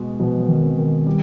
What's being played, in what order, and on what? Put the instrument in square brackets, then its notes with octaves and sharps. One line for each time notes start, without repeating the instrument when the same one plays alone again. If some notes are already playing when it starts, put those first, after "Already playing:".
Already playing: [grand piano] B2 G#3
[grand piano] B2 [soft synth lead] F3
[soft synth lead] F3
D#3
[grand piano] C4
[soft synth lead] D#3
[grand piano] G3